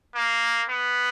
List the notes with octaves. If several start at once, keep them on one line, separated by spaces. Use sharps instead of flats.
A#3
B3